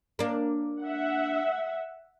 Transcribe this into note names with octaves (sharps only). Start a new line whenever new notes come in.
A#3 D4
E5 F#5